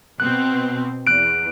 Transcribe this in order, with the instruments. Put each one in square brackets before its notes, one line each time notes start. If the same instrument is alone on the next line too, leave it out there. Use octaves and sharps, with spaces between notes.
[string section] B2 C4 [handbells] F#6
[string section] E2 [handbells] F#6 D7